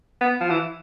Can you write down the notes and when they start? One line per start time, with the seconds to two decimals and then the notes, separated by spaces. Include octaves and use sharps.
0.21 B3
0.41 F3
0.50 E3